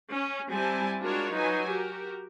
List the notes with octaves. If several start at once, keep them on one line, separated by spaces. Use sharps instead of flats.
C#4
G3 C4 E4 G#5 A5
G#3 D4 F4 F#4 A#4 C#5
F#3 D#4 F#4 B4 G#5
F#4 G4 A#4